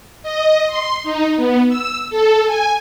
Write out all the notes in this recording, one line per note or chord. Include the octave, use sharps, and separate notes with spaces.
D#5
C6
D#4
B3
E6
A4
G#5